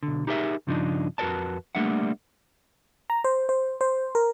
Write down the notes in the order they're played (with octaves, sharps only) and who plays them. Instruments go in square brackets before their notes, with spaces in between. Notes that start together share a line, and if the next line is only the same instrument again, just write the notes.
[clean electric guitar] B1 D3
D#4 G4 G#4 A#4 C5 E5
G2 C#3 F3 D4 D#4
F2 F#4 A#4 B4 D5 A5
G3 A3 A#3 D4 E5 F#5
[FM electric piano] A#5
C5
C5
C5
A#4